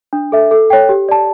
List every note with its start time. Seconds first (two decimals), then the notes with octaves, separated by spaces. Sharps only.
0.13 D4
0.32 A4 E5
0.51 A4
0.70 C#5 G5
0.89 G4
1.09 D5 A5